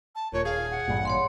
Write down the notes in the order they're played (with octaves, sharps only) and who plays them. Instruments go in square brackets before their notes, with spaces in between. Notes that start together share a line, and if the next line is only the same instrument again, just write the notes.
[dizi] A5
[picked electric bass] D#1 [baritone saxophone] A#2 [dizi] C#5
[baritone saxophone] G#4 [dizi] F5
[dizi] F#5
[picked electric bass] A1 G2 A#2
[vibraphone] C#5 F#5 C6